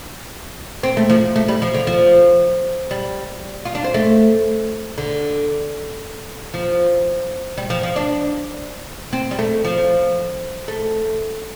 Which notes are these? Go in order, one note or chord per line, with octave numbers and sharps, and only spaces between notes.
C4
A3
F3
A3
G3
F3
D3
F3
G3
F4
D4
C4
A3
D3
F3
G3
F3
F3
D4
C4
G3
A3
F3
A3